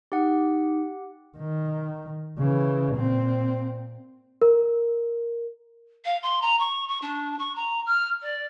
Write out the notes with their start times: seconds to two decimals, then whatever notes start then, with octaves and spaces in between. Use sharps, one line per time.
0.12 D#4 G4 F#5
1.38 D#3
2.38 C#3 E3
2.95 A#2 C4
4.42 A#4
6.05 F5
6.22 C6
6.42 A#5
6.59 C#6
6.88 C#6
7.02 D4
7.39 C#6
7.55 A#5
7.86 F6
8.22 D5